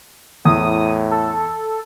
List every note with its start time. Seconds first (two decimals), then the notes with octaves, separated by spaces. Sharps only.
0.45 E2 A2 D#6
1.11 A4